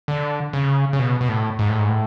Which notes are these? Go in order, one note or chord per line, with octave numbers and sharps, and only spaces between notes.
D3
C#3
C#3
B2
B2
A2
G#2
A2
G#2
A2